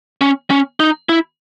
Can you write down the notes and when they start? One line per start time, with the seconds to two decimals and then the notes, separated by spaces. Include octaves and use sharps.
0.21 C#4
0.50 C#4
0.80 D#4
1.09 E4